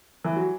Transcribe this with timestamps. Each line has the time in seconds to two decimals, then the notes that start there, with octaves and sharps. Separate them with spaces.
0.25 E3
0.36 F#3